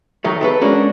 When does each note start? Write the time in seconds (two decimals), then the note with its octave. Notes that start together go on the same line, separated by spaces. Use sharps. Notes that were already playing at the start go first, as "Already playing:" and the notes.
0.24 D#3 F#3 A3
0.41 G#3 A4 B4
0.61 G#3 A#3 C#4 D4 F#4